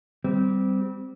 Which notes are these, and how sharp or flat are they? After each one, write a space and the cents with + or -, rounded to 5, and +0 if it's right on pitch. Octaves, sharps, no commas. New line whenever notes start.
G3 -10 C4 -20